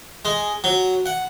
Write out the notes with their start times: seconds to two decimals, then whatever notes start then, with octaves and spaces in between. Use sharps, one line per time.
0.25 G#3
0.64 F#3
1.06 F#5